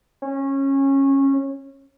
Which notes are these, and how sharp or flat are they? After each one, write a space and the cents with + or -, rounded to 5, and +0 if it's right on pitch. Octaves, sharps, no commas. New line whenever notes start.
C#4 -20